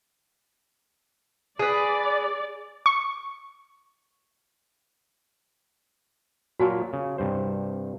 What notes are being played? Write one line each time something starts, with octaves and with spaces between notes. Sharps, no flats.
G#4 B4 D5
C#6
A#2 F#3 F4 F#4 G#5 A5
C#3
C2 G2 C5